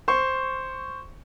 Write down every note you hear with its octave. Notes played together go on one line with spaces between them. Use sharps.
C5 C#6